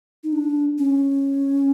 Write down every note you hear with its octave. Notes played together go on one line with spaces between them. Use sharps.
D#4
D4
C#4